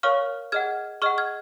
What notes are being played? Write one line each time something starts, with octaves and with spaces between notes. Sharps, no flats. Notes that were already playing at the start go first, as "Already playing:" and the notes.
A#4 C#5 F5 C#6 F6
G#4 D#5 F#5 F6 G#6
G#4 D#5 F#5 C#6 F6
F6 G#6